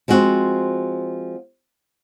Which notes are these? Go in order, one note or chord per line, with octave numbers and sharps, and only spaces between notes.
F3 G#3 C4 F#4